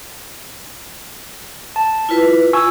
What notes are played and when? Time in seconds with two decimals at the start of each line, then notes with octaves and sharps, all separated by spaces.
1.76 A5
2.09 E4 F4 B4
2.53 F4 G#5 C#6 E6